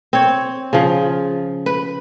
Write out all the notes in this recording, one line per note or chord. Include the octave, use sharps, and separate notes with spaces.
C4 C#5
C#3 F3
B4